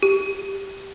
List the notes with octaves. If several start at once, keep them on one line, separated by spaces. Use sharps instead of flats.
G4